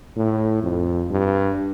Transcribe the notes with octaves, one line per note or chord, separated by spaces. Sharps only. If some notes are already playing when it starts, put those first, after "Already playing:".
A2
F2
G2